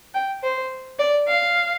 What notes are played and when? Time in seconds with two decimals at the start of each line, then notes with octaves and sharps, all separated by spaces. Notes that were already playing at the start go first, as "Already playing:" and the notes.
0.14 G5
0.43 C5
0.99 D5
1.28 F5